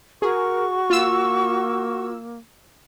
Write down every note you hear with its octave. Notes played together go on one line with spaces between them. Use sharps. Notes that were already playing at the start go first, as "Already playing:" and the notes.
F#4 G#4 A#4 C#6
A#3 F4 E6